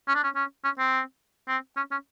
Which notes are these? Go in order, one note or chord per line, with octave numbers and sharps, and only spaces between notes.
C#4
D4
C#4
C#4
C#4
C4
C4
C#4
C#4